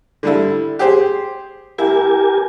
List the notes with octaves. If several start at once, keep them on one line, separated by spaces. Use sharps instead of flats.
D3 G3 E4
G4 G#4 C5
E4 G4 A#4 G#5